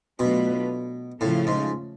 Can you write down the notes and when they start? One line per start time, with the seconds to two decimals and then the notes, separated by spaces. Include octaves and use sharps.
0.19 B2 F#3 A3 D4 F4 B4
1.21 A2 C#3 F3 A3 F4
1.47 G#2